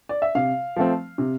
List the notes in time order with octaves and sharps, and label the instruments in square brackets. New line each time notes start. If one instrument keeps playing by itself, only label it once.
[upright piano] D5
E5
C3 F5
F3 A3 C4
C3